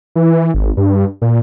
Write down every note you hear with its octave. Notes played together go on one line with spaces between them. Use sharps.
E3
G#1
G2
A#2